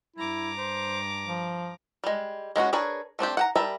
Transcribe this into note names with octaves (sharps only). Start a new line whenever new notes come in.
G2 E4 A#5 D6
C5
F3
G3 G#3
G#3 B3 C#4 F#4
D4 G#4 A#4 B4 C#5
A3 C4 D4 G4
F#5 G5 A#5
G3 A#4 E5 A5 B5